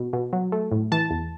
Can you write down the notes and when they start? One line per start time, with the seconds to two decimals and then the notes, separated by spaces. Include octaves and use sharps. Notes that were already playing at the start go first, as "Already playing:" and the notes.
Already playing: B2
0.13 B2
0.33 F#3
0.52 A3
0.72 A2
0.92 E3 A5
1.11 E2